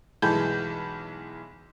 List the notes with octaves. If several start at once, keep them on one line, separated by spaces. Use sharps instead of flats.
B1 E3 G#3 A5 B5 G6